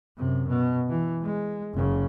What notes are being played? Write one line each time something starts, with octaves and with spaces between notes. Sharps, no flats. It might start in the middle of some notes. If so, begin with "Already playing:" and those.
F#2 C3
B2
E3
G#3
F#1 C#3